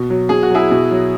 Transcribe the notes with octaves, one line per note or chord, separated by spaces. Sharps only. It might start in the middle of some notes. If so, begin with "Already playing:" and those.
Already playing: B2
F#3
B2 G#4
F#4
F#3 E4 G#4
B2
F#3